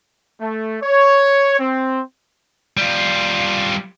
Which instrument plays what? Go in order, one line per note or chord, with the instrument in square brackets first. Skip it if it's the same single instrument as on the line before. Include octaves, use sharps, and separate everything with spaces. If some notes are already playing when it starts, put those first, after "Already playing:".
[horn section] A3
C#5
C4
[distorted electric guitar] G3 F4